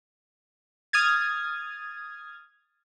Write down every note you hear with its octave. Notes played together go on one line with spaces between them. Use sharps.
D#6 F6 G#6 A6